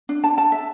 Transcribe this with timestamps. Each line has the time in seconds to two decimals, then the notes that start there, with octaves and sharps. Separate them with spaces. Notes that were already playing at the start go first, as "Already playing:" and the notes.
0.09 D4
0.24 A5
0.38 A5
0.52 E5